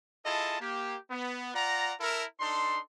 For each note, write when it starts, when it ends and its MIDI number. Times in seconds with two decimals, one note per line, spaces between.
0.26 0.58 64
0.26 0.58 65
0.26 0.58 68
0.26 0.58 69
0.26 0.58 75
0.26 0.58 81
0.60 0.96 58
0.60 0.96 67
1.10 1.52 59
1.55 1.93 65
1.55 1.93 74
1.55 1.93 78
1.55 1.93 82
2.00 2.25 64
2.00 2.25 69
2.00 2.25 70
2.40 2.79 62
2.40 2.79 63
2.40 2.79 69
2.40 2.79 84